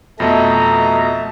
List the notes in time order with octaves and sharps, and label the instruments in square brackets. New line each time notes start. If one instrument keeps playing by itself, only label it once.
[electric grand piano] F2 B2 D#5 [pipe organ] A3 A#5 [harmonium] E5 A5